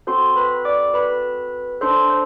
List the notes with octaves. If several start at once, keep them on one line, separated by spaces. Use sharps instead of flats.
C4 F#4 A4 C5 C6
B4 B5
D5 D6
B4 B5
D4 A4 C5 C6
C5